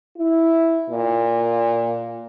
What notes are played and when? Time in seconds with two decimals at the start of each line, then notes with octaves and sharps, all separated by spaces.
0.17 E4
0.90 A#2